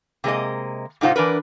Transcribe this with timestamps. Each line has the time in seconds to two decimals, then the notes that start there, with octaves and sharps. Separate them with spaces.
0.24 C3 G#3 A#3 D#5
1.01 G#2 C3 D#4 F4 C5 F#5
1.16 E3 D4 A#4 B4